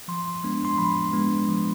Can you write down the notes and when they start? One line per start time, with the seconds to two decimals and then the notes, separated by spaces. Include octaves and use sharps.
0.08 F3 C6
0.44 G#3 B3 D4
0.65 C6
0.78 F3 B5
1.13 G#3 B3 D4
1.48 F3